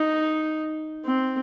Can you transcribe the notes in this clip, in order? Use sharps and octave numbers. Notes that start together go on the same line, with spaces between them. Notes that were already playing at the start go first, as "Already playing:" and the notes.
Already playing: D#4
C4